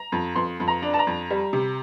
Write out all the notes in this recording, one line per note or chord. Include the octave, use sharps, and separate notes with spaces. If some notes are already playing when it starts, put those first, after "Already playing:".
Already playing: A#5
F2
F2 C6
F2
A#5
D4
A5
A#5
F2
G3
C3